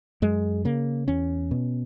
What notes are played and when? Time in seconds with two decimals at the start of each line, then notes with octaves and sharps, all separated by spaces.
0.22 F#2 G#3
0.65 C#3 A#3
1.08 E2 C#4
1.51 B2